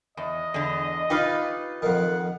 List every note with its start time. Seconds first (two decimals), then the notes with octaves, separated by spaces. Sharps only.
0.17 E2 D#5
0.54 E2 D3
1.10 D#4 F4 G4 B4 F5
1.82 F2 D#3 F#5